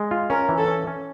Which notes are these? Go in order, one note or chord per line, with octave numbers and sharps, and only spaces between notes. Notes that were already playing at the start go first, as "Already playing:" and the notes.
Already playing: G#3
F4
C#4 A#4
E3
A4
C#4
C#4